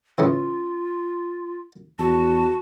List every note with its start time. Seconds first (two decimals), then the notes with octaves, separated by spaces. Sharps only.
0.18 A2 C#3 E3 F4
1.99 E2 F#4 A5